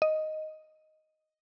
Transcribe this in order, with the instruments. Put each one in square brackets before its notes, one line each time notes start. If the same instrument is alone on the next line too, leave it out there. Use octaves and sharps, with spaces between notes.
[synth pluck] D#5